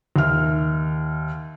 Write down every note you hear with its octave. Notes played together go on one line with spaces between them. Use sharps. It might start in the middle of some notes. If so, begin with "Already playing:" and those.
D#2 E5 F6